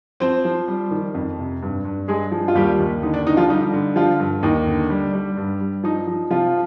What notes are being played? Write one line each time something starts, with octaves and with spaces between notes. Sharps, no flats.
F3 C4 C5
F3
G3
D#3
F2
C3
G2
G2
G2 G#3 G#4
F3
F4
D#2 G3 G4
D#2
D3 D#4
D4
D3 D#4
F3 F4
G3 D#4
D3
F3 F4
G2
D#2 D#4
D3
G3
G3
G2
G2
F3 D#4
F3
C3 F3 F4